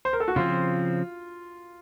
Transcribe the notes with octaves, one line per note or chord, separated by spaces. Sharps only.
C5
A#4
A4
F#4
C#3 F3 C4 F4